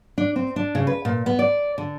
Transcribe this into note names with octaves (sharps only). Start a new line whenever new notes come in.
D4
C4
D4
C#3
B4
A#2
B3
D5
D3